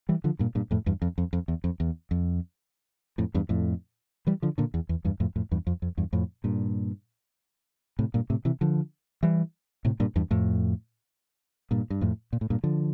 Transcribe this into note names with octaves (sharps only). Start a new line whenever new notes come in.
E3 G3
D3 F3
G2 A#2
G2 A#2
F2 A2
E2 G2
F2
F2
F2
E2
F2
E2
F2
F2 A2
E2 G2
F2 A2
E3 G3
D3 F3
A#2 D3
E2
E2
E2 G2
F2 A2
F2 A2
E2 G2
F2
F2
E2 G2
F2 A2
G2 A#2
A2 C3
G2 A#2
A2 C3
C3 E3
D3 F3
E3 G3
A2 C3
G2 A#2
E2 G2
F2 A2
G2 A#2
G2
F2 A2
A#2
A2
G2 A#2
D3 F3